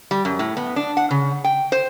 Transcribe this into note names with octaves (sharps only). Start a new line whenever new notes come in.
G3
F#2
A2
B3
D4
F#5
C#3
G5
C5